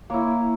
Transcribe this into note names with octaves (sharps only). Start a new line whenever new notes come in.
A#3 E4 C#5